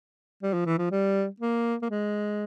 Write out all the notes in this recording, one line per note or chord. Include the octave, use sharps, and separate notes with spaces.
G3
F3
E3
F3
G3
A#3
A#3
G#3